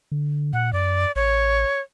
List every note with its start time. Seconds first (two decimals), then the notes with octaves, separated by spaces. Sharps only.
0.12 D3
0.53 A#2 F#5
0.73 F#2 D5
1.16 A1 C#5